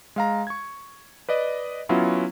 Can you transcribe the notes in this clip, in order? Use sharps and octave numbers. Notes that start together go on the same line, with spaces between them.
G#3 F5 A#5
C#6 G#6
B4 D5 D#5
F#3 B3 C#4 E4 F4